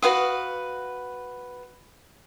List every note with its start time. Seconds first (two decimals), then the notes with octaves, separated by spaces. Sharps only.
0.02 F#4 B4 F5 D#6